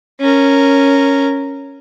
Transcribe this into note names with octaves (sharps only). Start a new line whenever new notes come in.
C#4 A#4